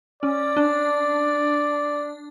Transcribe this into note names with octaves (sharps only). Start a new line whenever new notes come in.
C#4 D5
D4